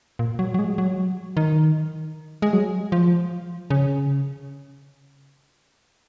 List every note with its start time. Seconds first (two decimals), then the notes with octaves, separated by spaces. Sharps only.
0.19 A#2
0.39 F#3
0.54 F#3
0.59 G#3
0.78 F#3
1.37 D#3
2.42 G#3
2.53 F#3
2.92 F3
3.70 C#3